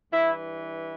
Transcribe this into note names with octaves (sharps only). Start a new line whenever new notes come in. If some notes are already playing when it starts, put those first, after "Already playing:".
G2 E3 E4